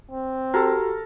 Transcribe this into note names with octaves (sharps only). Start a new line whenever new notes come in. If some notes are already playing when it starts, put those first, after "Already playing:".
C4
F#4 G4 A4 A#4